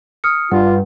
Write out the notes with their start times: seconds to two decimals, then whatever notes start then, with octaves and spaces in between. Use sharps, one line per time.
0.24 D#6 F6 C#7
0.51 G2 F4 F#5